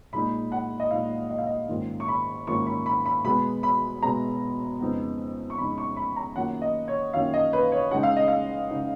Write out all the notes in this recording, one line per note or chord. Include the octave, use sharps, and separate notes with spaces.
A#2 G#3 D#4 B5
F#5
D#5
A#2 G#3 D#4 F5
D#5
F5
D#5
G#2 D#3 A#3 C#4 F4
C#6
B5
G#2 D#3 A#3 C#4 F4 C#6
B5
B5
B5
B2 G#3 B3 B5
B5
B2 G#3 B3 A#5
F2 C#3 G#3 B3 D#4
C#6
F2 C#3 G#3 B3 D#4 B5
C#6
B5
A#5
F#2 D#3 A#3 C#4 F4 F#5
D#5
C#5
F#2 D#3 A#3 C#4 F4 F5
D#5
B4
C#5
C#3 G#3 D#4 F#5
F5
D#5
F5
C#3 G#3 D#4